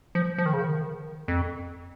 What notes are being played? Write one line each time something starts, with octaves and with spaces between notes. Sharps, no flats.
F3
F3
D#3
C#3
D#3
F2